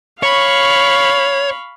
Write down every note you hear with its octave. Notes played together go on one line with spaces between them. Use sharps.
C#5 F5 B5 C#6